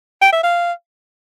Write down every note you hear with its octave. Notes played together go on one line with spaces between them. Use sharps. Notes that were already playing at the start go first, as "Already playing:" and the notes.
G5
E5
F5